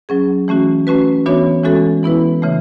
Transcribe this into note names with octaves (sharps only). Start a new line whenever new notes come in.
F#3 C#4 G#4
E3 A3 C#4 F#4
A3 C#4 F#4 B4
E3 B3 D4 F#4 C#5
E3 G#3 C#4 F#4 A4
E3 B3 E4 B4
C#3 E3 A3